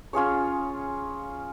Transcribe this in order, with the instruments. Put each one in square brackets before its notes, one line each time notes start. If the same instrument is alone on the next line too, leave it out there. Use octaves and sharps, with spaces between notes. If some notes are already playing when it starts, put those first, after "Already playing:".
[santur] C#4 F4 G#4 C#5